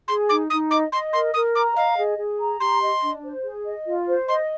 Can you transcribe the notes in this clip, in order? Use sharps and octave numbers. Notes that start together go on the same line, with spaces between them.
G#4 C6
D#4 D6
D#4 D#6
D#5 D6
D#5 C6
A#4 C6
A#4 D#6
A#5 D6
D#5 F5
G#4
G#4
A#5
G4 C6
D#5
D4
C5
G#4
D#5
F4
C5
D#5 C6